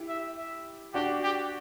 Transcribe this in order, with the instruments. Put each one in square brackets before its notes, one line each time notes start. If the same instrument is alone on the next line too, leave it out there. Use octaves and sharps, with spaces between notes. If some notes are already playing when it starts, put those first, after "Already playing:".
Already playing: [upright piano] E4 G4
[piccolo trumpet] E5
E5
[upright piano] D4 F#4 [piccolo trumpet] G4
[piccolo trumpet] G4